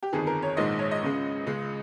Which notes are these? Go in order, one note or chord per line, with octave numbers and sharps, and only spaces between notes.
G4
G1 F2 D#3 G#4
A#4
C#5
A#1 G#2 D#3 G#3 D#5
C#5
D#5
C#2 C#3 G#3
C#2 C#3 G#3